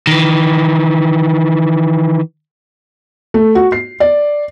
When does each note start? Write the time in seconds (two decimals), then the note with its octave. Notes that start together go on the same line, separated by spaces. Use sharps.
0.07 D#3 E3
3.34 A3
3.55 F#4
3.72 C7
4.00 D5